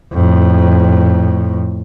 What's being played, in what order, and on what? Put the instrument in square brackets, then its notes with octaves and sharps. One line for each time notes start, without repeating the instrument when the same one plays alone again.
[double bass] F2 A2